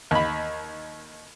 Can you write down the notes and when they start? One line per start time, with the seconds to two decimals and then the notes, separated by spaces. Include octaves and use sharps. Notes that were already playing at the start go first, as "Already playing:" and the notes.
0.11 D#2 B5